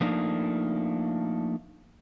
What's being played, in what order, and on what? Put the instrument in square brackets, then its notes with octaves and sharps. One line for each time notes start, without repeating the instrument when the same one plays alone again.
[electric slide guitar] F3 A3 A#3 D4 D#4